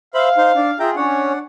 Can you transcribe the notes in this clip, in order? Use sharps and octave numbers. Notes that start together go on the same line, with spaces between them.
C5 E5 F5 B5
D#4 C5
D4
F4 G#4 E5 G5 A#5
C#4 D4 C#5 F#5